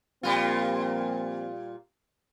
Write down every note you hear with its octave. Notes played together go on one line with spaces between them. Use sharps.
A#2 F3 G3 A#3 C4 F4